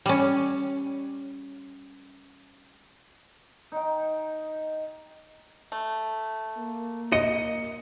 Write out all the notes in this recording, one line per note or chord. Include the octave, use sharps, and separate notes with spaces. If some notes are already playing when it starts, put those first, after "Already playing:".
G3 C#4
D#4 G5
A3
A#3
D#5 C#7